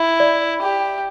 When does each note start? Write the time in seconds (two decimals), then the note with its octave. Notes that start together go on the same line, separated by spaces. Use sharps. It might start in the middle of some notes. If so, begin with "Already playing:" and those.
Already playing: E4
0.20 D5
0.62 G4